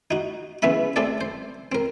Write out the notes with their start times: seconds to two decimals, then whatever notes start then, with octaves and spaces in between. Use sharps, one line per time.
0.11 D#4 F#4
0.62 E2 C#3 B3 C#4 E5 B5
0.96 A3 C4 G#4 A4 D5
1.21 C5
1.72 C4 A#4